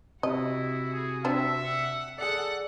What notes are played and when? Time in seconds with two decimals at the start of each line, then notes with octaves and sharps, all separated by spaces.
0.23 C3 E4 F#4 D#5
0.93 G#4
1.25 C4 D4 E5
1.64 F#5
2.18 G#4 A4 D5 F#5 F#6